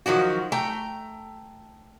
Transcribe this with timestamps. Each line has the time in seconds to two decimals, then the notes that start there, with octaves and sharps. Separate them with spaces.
0.06 D#3 F3 F#3 F#4
0.52 A3 G5 A#5